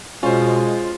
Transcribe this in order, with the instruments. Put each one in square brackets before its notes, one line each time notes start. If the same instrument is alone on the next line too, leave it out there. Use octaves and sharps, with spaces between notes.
[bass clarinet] B2 [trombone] G#3 [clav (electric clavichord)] C#4 [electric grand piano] F4 C5